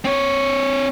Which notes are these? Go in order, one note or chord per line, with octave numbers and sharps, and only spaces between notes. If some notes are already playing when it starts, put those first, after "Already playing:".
C4 C#5